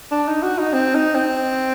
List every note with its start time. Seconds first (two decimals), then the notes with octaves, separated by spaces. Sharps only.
0.11 D4
0.28 D#4
0.42 F#4
0.58 D#4
0.73 C4
0.94 D#4
1.15 C4